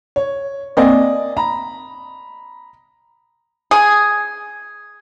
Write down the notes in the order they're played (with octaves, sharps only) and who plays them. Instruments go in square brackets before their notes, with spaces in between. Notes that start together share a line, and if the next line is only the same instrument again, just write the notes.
[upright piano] C#5
[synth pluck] A#3 C4 [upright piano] D5 D#5 G#5
[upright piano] A#5 B5
[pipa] G#4